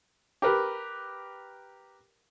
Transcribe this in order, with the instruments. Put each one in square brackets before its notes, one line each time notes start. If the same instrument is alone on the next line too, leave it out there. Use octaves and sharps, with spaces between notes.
[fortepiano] G4 A#4 B4